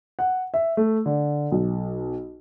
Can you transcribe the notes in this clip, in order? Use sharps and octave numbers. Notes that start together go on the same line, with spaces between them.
F#5
E5
A3
D3
B1